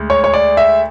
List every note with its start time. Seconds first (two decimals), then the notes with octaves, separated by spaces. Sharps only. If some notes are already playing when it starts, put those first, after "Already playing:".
Already playing: D2 G#3
0.10 C#5
0.24 C#5
0.34 D5
0.57 E5